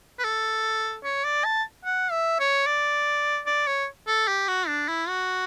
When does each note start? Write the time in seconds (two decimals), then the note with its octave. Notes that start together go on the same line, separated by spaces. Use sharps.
0.19 B4
0.24 A4
1.04 C#5
1.24 D5
1.44 A5
1.85 F#5
2.11 E5
2.39 C#5
2.66 D5
3.46 D5
3.67 C#5
4.08 A4
4.28 G4
4.48 F#4
4.68 D4
4.88 E4
5.08 F#4